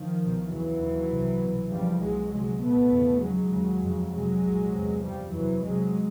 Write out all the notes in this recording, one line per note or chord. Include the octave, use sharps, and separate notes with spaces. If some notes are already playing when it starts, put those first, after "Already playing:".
Already playing: D#3 F3
C2 B2
D#2 C#3 E3 F#3
D#2 C#3
C2 C3
C2 B2
D#2 C#3 F3 G3
C2 B2 F#3 G#3
D2 C3 F#3 G#3
C2 A#2 A3 B3
E2 C#3
D#2 C#3 F#3 G#3
D#2 C#3
F2 C#3
F2 C3 F#3 G#3
C2 A#2
E2 C3
F#2 C#3 F3 G3
E2 C3 E3 F#3
C2 C3 F#3 G#3